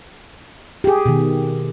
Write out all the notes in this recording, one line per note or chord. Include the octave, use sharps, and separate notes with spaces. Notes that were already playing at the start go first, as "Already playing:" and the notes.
G4 G#4
B2 D#3